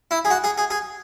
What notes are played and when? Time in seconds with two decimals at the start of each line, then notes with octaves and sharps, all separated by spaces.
0.11 E4
0.25 G#4
0.31 F#4
0.44 G#4
0.58 G#4
0.70 G#4